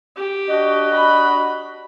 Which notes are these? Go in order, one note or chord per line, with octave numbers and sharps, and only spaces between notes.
G4
D4 F#4 D#5
B5